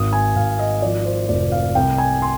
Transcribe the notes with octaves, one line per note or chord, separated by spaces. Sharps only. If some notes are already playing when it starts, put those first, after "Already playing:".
Already playing: G#1 D#6
G#5
G#1 F5
D#5
F3 D5
C5
F1 D5
F5
C2 G5
G#5
C6